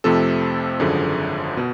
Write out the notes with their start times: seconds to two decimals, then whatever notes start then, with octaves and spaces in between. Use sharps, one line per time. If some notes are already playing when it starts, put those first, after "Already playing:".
0.04 F2 C3 F3 A3 C4 A4
0.80 G#1 F#2 D3 F3 G#4
1.57 B2